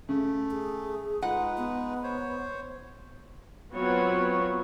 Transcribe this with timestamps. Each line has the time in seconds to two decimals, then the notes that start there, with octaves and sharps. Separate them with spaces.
0.09 C#3 A3
0.51 G#4
1.22 G#3 D#4 F4 B4 F#5
1.57 B3
2.03 C5 C#5
3.74 F#3 B3 C4 F4 F#4 C#5